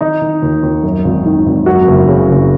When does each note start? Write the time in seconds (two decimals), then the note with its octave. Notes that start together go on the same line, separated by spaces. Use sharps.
0.01 D#3 D#4
0.22 D#3
0.42 D#2
0.63 D#2
0.83 F#2
1.04 G#1
1.26 D#3
1.46 G#1
1.66 F#2 F#4
1.88 F#1
2.08 C#3
2.28 F#1